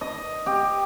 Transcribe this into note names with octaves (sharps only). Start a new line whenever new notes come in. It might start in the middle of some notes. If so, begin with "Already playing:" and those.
D#5
G4